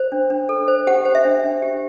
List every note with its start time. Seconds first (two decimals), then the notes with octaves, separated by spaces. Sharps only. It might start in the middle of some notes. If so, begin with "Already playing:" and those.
Already playing: C5
0.12 D4
0.30 D4
0.49 A4
0.68 C5
0.87 G4 F#5
1.05 C5
1.15 E5
1.25 D4
1.44 D4
1.62 G4